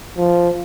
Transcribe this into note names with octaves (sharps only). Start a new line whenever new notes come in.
F3